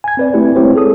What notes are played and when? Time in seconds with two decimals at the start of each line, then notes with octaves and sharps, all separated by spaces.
0.04 G#5 G#6
0.17 C4 B4 D5
0.34 A3 C4 E4 G4 B4
0.55 G#3 C4 E4 G4 C5 C#5
0.75 G#4 A4 D#6